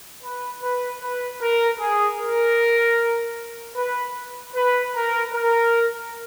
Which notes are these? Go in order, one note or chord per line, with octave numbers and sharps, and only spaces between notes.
B4
B4
B4
A#4
G#4
A#4
B4
B4
A#4
A#4